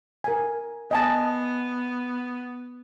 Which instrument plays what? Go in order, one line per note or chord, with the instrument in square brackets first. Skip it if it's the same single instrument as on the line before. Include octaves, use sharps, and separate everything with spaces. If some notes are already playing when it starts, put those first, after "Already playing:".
[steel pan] A#4 G#5
[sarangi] B3 [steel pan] D#5 G#5 A5